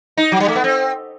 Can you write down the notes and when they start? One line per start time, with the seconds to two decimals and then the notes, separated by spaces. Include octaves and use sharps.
0.17 D#4
0.32 F#3
0.40 G3
0.48 A3
0.55 B3
0.64 C4